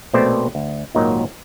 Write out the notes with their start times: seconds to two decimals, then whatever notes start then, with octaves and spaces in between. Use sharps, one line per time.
0.13 A#1 B2 A3 C4 C5 D5
0.55 D2
0.95 G#1 D#2 A#2 F#3 D#4